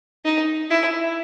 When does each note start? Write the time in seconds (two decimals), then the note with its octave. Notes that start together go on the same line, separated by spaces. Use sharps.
0.25 D#4
0.71 E4